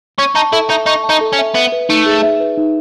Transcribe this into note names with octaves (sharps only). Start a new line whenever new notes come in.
C#4 C#6
D#4 A5
E4 A4
D#4 E5
D#4 C#6
A5
D#4
A4
C#4
E5
B3 E5
B4
A3 D#4
G#4
E5
B4
D#4